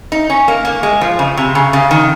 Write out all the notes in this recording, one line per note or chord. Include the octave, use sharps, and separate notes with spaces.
D#4
C#4
A#3
A#3
G#3
F3
C#3
C3
C#3
C#3
D#3